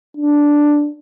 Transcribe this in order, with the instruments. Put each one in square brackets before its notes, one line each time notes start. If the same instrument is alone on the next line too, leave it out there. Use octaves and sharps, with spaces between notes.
[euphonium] D4